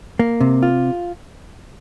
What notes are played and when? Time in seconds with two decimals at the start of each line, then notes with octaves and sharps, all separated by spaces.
0.19 A#3
0.41 C3
0.63 F4